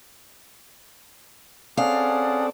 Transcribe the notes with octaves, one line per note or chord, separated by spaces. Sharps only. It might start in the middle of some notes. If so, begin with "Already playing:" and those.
C4 C#4 G#4 A4 D5 F5 F#5